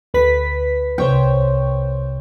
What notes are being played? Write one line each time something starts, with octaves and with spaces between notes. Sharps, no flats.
D2 B4 B6
C2 C5 C#5 G5